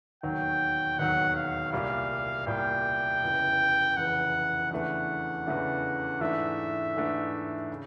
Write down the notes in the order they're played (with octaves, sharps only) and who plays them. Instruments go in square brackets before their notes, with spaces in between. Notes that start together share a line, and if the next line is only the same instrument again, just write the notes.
[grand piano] E1 D#2 D#3 F#3 [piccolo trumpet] G5
[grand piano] E1 D#2 D#3 F#3 [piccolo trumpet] F#5
[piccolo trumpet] F5
[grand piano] C2 A#2 G3 [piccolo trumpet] F5
[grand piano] C2 A#2 G3 [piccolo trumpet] G5
[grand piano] F1 E2 C#3 E3
[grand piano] F1 E2 C#3 E3 [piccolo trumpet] F#5
[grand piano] E2 C#3 E3 A3 D4 [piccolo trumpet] F#5
[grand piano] E2 C#3 E3 A3 D4
[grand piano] G#2 E3 A3 D4 [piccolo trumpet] E5
[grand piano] G#2 E3 A3 D4
C#3